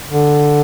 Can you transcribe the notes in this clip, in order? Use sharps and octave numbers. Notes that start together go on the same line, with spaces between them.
D3